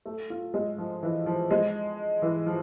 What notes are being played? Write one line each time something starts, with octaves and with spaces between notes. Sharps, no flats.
A3
F4
G#3
F3
E3
F3
G#3
E3
F3